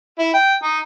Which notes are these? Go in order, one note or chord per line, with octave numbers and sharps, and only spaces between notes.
E4
G5
D#4